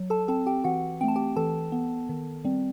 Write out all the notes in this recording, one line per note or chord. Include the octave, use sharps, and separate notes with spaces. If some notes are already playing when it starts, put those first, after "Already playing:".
Already playing: F#3
A4 A5
C4 A4 A5
G4 G5
E3 F#4 F#5
A3 C4 G5 A5
G4 G5
E3 A4 A5
B3
D#3
G3 C4